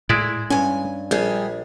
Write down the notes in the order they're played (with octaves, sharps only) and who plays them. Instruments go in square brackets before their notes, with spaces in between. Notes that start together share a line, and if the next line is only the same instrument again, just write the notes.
[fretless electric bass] A2 [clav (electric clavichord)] G#3 E4 D5
[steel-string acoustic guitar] G2 G#5 [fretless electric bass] C#4
[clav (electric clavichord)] A#1 [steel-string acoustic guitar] G3 G#4